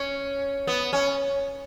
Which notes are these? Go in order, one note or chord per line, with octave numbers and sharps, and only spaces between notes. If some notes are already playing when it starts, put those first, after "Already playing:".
Already playing: C#4
B3
C#4